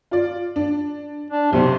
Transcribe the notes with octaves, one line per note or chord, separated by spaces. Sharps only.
F4 D5
D4
D4
B1 C3